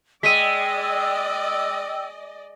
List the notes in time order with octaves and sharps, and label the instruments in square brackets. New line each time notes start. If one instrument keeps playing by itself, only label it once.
[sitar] G#3 [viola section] D5 D#5 [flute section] G5 E6 [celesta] B6 D#7